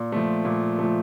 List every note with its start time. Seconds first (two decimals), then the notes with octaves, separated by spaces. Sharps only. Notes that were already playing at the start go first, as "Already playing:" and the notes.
Already playing: A#2
0.12 F3 A3
0.45 A#2
0.79 F3 A3